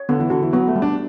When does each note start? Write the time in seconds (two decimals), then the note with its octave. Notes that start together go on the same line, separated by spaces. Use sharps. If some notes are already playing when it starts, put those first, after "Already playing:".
Already playing: C#5
0.09 D3 B3
0.20 E3
0.30 D3 F#4
0.42 E3
0.53 F#3 B3
0.68 A3
0.76 G3
0.82 D4